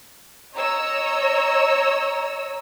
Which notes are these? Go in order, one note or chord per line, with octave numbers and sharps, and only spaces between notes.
C#5 D#5 A#5 E6